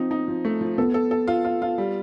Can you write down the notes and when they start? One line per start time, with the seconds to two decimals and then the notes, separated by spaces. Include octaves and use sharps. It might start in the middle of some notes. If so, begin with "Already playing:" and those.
Already playing: F3 C4 D#4
0.11 D#4
0.28 F3
0.45 A3
0.61 F3
0.78 B3 A4
0.94 A4
1.11 A4
1.28 F4
1.45 F4
1.62 F4
1.78 G3